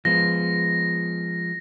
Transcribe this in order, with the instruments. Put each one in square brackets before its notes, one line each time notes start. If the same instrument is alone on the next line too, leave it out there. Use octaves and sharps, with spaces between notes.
[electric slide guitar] F3 G#3 B3 [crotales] A#6